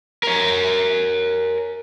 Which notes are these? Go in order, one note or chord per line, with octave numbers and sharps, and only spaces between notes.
A#4 C#5